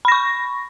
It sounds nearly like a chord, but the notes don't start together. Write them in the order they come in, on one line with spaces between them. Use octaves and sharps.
B5 A#6 C#6